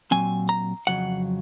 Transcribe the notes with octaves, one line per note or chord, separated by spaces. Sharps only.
A#2 F#3 C4 G#5
A#5
F2 C#3 F#3 F#5